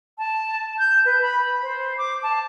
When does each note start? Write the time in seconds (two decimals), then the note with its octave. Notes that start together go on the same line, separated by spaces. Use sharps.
0.18 A5
0.79 G6
1.05 B4
1.22 B5
1.62 C5
1.98 D6
2.23 A5